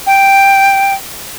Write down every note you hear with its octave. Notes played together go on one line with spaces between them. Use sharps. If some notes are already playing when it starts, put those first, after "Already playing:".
G5